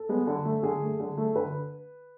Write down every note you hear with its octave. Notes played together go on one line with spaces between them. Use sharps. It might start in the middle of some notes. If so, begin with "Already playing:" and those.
Already playing: A4
G#3 B3
D3
A3
D3 G#4
A3
D3
A3
D3 B4